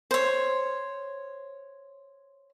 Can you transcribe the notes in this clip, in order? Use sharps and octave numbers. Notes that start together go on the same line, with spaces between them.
C5 C#5